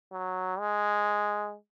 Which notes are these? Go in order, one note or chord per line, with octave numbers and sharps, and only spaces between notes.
F#3
G#3